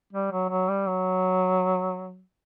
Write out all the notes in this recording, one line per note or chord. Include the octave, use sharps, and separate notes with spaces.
G3
F#3
F#3
G3
F#3